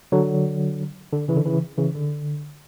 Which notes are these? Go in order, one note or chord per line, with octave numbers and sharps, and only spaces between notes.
D3 F#3
D3
C#3 E3
D3
C#3 E3
C#3 E3
D3